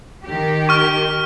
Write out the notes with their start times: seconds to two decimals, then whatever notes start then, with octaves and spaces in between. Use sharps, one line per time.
0.25 D#3 G4
0.69 C#6 F6